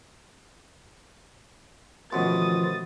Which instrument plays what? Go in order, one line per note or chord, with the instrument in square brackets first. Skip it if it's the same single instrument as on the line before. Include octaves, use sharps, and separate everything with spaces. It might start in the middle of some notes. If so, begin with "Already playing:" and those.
[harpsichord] A1 B2 [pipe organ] D#3 F3 F4 [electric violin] D#6 A6